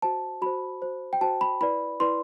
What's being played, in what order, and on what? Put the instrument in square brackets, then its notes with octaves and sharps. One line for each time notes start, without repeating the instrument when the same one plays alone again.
[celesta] F#4 C5 A5
F#4 C5 B5
F#4 C5
G5
F#4 C5 A5
B5
E4 B4 D5 B5
E4 B4 D5 C6